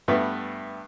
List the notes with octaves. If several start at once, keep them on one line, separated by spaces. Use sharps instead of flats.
G2 A3 B3